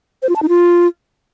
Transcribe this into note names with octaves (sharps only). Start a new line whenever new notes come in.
C5
F4
A5
D#4
F4